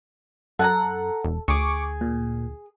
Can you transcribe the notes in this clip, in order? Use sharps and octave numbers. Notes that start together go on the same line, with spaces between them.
F#2 A4 F#5 G#5 A#5
E1
D2 G#4 C#6 D6
A#2